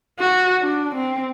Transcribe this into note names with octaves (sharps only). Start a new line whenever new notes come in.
F#4
D4
C4